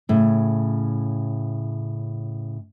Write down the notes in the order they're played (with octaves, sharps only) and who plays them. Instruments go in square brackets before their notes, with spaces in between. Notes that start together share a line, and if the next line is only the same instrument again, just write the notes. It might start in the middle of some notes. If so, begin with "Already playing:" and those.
[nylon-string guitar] A2 C#3